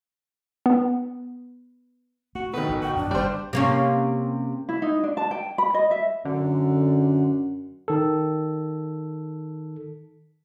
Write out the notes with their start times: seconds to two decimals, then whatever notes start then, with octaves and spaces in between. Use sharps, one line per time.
0.66 B3
2.35 A3 F#4
2.53 B2 D#3 A4 B4
2.69 A1 D3
2.82 F#4 G5
2.96 F#2 F3 D4
3.11 F#1 D#3 G3 C5 D5
3.53 C3 A#3 C#4
4.69 E4
4.82 D#4
5.03 D4
5.17 A5
5.31 G5
5.58 B5
5.74 D#5
5.91 E5
6.25 F#2 D3
7.88 D#3 A4